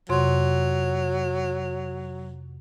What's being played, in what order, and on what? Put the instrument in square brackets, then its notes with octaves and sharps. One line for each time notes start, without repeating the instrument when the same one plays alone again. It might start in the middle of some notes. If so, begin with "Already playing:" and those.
[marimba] F2 C3 C6 [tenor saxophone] F#3